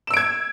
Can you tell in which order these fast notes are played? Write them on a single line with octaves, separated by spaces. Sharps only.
E7 E6 D7 G#6